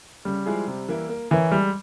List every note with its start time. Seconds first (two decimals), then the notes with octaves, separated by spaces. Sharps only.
0.25 C#3 G3
0.46 F3 G#3 E4 G#4
0.68 C3
0.88 E3 A#3 E4
1.09 A#3
1.31 E3 E4 A#4 C#5
1.52 G3 G#3